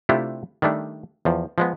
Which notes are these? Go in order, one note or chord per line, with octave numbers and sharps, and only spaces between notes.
C3 A3 D4 E4 F4 G4
D#3 G3 A3 D4
E2 F3
F3 G#3 B3